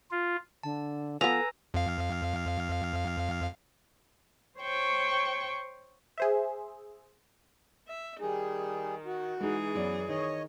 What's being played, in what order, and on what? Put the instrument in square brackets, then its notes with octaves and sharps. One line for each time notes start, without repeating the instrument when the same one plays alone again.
[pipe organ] F4
[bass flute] D3 [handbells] A5
[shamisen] F3 B3 [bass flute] A4 [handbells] B4 G#5 E6 [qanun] A#5
[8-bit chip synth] F2 F5
[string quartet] C5 C#5 G5 C#6
[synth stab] G#4 C5 E5
[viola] E5
[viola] D#3 [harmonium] G3 G#4
[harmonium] F#4
[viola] E3 G#4 [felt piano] G#3 D#4
[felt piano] F#2 D5 [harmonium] B3
[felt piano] D#3 [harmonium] C#5 D#5